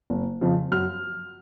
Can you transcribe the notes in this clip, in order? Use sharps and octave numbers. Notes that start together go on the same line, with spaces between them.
F#1
F2 C#3 F3
F#2 F6